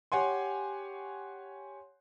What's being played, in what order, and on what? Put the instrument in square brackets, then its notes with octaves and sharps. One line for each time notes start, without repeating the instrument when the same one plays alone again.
[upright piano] G4 C#5 F#5 G#5 C6